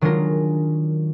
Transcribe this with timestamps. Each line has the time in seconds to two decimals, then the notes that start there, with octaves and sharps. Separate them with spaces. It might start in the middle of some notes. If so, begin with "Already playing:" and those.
0.01 D#3 F#3 G#3 D4 F4 A#4